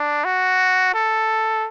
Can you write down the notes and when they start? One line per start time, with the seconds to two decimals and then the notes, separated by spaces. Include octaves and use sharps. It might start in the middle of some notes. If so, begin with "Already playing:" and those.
Already playing: D4
0.24 F#4
0.94 A4